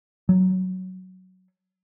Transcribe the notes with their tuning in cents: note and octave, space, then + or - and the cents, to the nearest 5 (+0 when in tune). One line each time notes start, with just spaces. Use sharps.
F#3 +5